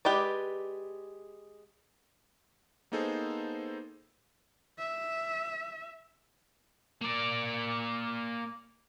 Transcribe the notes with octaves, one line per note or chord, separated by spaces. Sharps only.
G#3 G4 B4 D5
A#3 B3 D#4 G#4 A4 C5
E5
A#3 D5